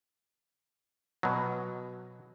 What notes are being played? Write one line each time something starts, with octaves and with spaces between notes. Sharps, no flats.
B2 F#3